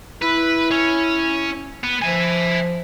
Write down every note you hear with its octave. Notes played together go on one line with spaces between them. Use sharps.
E4 B4
C#4
B3
F3 E5 G#5